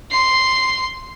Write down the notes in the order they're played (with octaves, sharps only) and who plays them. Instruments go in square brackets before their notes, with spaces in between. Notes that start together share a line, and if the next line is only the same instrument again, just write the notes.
[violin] C6 C7